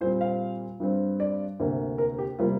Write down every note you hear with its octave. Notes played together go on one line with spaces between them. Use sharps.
A#2 G3 C4 C5
F5
G2 G3 C4
D5
D2 C3 A#3
A#4
G4
C3 G3 A#3 F4